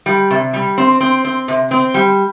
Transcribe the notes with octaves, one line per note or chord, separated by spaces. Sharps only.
G3
C3
G3
C4
C4
C4
C3
C4
G3